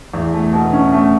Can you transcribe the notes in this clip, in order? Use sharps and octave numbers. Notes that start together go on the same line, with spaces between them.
E2
A3
B2
C#4
A3